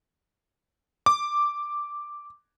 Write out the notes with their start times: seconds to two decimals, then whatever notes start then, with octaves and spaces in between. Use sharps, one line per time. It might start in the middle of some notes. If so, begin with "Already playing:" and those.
1.06 D6